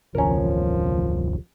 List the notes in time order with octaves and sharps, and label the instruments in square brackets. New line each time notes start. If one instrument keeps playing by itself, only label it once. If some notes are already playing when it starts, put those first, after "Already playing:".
[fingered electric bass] E1 C#2 D#3 [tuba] F3 [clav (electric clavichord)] C#4 A#4